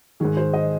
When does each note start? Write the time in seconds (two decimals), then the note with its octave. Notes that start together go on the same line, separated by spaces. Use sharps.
0.20 G#2 D#3 G#4
0.37 C5
0.54 D#5